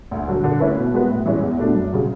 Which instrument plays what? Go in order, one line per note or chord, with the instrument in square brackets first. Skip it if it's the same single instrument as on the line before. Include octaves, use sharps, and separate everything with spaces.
[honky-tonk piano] D2
D3 F#3
D3
A3 C#4 E4 B4
B2
G#3 B3 F#4 B4
A2
E3 G#3 C#4
E2
B2 A3 D4
F#2
C#3 F#3